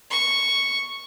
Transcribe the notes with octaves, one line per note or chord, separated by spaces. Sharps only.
C#6